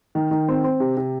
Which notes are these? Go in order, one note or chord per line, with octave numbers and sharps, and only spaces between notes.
D#3
D#3
C4
C4
C3
C3